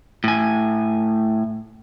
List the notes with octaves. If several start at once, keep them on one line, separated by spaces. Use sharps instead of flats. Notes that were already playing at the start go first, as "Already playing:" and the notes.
A2 G#5